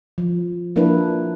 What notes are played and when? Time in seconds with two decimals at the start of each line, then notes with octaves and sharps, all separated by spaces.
0.18 F3
0.76 F3 A#3 D4 E4 B4